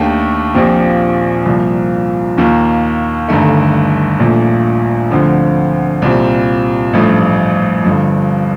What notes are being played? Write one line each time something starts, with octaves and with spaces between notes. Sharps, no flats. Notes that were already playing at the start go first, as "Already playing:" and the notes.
Already playing: D#2 D#3 A3 D4 G4
A#1 A#2 F3 C4 G4
C2 A#2 F3
D#2 D#3 A#3 F4
G1 G2 D#3 A3
A#1 A#2 A3
D2 D3 F3 C4
C2 A#2 G3 C4
A1 G2 F3 A3
G1 G2 F3